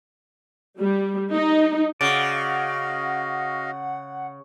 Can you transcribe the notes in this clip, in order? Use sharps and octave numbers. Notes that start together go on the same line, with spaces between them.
G3
D#4
C#3 F#4 D5 D#5 F5 F#5